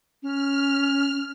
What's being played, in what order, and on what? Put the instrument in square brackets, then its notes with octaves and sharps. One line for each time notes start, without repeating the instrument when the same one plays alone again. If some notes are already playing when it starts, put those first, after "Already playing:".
[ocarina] C#4 [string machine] F6